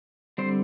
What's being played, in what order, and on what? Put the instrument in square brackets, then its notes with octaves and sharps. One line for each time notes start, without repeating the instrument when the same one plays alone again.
[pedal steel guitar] D3 G3 C4 C5